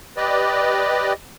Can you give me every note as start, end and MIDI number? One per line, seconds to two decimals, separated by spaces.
0.17 1.13 67
0.17 1.13 71
0.17 1.13 74
0.17 1.13 75